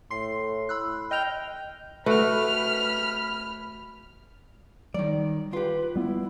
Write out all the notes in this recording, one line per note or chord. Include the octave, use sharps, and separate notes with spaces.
A2 C6 C7
B5 E6 F#6
D#5 G5 F6 F7
A3 F#4 B4 B5 F6
D#3 F#3 G3 D5
F4 G4 B4
G3 B3 E4